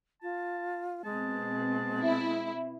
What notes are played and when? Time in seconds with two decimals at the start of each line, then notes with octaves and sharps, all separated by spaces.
0.22 F4 A5
1.05 B2 G#3 C4 A5
2.00 E4